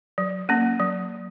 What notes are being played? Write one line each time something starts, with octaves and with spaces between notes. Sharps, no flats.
F#3
A#3 C#4
F#3